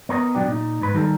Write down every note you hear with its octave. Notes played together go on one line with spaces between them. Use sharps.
B3 A#4 C#5 D#5
B2 F#3 D4 G4
A#2 D#4
G#2 B4
D#3 G3 D#4 A4 A#4